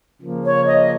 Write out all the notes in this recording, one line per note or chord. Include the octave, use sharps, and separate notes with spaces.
C#3 F3 A#3
C#5
D#5